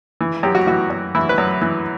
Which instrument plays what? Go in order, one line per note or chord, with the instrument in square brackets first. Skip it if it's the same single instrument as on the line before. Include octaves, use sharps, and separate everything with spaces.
[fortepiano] E3
F#2 G4
F#4
E3 F#4
F#2
E3 E4
B4
F#2
E3